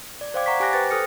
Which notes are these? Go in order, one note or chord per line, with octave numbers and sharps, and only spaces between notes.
D5
C5 D5 F5 G5 D6 G#6
F#5 A#5 C#6 B6
G4 G#5 D6 F#6 A#6
B4 C5 G5 A6
A4 D#6 F6 A#6 C#7